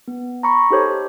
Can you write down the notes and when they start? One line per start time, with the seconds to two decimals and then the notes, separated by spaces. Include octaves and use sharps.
0.08 B3
0.43 A#5 B5 C#6
0.70 D#4 G4 A4 C5 C#5